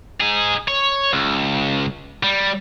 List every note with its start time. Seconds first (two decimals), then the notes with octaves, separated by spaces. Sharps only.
0.21 D#4 G#4
0.68 C#5
1.13 C#2
2.23 G3